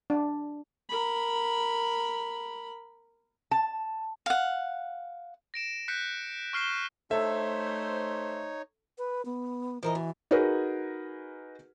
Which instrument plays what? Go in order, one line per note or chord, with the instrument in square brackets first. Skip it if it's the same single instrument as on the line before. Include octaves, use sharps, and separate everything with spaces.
[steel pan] D4
[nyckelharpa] A#4 B5
[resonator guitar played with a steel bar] A5
[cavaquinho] F5 F#5
[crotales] A#6 D7 E7
F#6 G6 B6 C#7
C#6 F6 C7 E7 G7
[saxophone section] A3 C5 [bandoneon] D#4 C#5 [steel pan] A4 [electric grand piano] E5
[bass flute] B4
B3
[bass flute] E3 [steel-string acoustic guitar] F3 A#4 D#5
[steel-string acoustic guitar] B2
[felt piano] D#4 F#4 G#4 A#4 B4